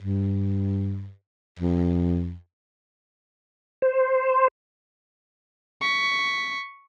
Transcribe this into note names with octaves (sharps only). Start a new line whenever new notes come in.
G2
F2
C5
C#6 B6